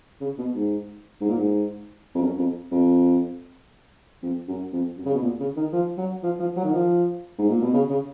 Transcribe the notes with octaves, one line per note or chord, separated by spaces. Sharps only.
C#3
B2
G#2
G#2
A#2
G#2
F2
F#2
F2
F2
F2
F#2
F2
F#2
C#3
B2
A#2
C#3
D#3
F3
F#3
F3
F3
F#3
D#3
F3
G#2
A#2
B2
C#3
C#3